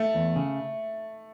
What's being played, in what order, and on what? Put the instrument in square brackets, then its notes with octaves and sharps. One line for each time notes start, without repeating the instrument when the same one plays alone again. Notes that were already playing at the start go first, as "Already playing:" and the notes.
Already playing: [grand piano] A3
[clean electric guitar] E2
C#3